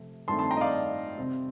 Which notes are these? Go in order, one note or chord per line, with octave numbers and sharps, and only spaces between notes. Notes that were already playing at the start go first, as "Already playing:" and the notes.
Already playing: C3 F3 A3
G2 D#3 A3 C4 A5 C6
A5 C6
G5 A#5
D#5
D5 F5
C3 G3 C4